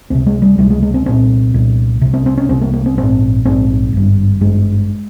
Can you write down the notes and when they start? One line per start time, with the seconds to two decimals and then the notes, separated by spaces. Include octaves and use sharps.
0.10 C#2 C3 C4
0.26 G#3
0.42 G3
0.58 C#2 C3 G3
0.70 G#3
0.83 G#3
0.94 C4
1.06 C2 A#2 C4
1.54 C2 A#2
2.01 C2 C3
2.14 C4
2.26 C4
2.37 C#4
2.49 C2 C3 C4
2.61 A#3
2.73 A#3
2.86 C4
2.97 A#1 G#2 C4
3.45 A#1 G#2 C4
3.93 G#1 G2
4.41 G#1 G2 G#3